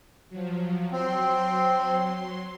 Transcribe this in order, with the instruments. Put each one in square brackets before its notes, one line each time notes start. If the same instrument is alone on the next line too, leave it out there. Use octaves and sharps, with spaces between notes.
[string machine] F3 F#3
[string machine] F#3 C6 [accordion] C4